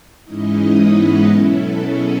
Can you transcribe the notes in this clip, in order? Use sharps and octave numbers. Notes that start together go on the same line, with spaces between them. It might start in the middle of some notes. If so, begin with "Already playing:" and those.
G#2 E3 G#3 C#4 D#4 E4 D#5
B3 B4
B2 F#3 C#4 E4 A4
G#4